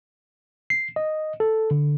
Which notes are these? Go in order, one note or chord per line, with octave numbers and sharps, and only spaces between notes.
C7
D#5
A4
D3